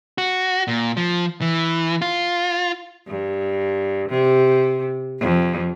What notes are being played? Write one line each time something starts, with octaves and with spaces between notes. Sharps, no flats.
F#4
A#2
F3
E3
F4
G2
C3
F2